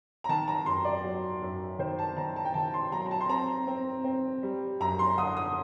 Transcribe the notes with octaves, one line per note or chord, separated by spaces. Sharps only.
A#5
D#3 A5
A#5
F#2 C6
D5
F#3
F#2
D#3 C5
A5
D#3 A#5
A5
G5
D#3 A5
C6
F#3 A#5
A#5
A5
C6
C4 A#5
C4
C4
G3
F#2 A#5
C6
D3 D#6
D#6